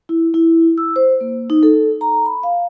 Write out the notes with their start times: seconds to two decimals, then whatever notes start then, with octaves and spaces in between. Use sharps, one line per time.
0.09 E4
0.34 E4
0.78 E6
0.96 C5
1.21 A#3
1.50 D#4
1.63 A4
2.01 A#5
2.26 B5
2.43 F5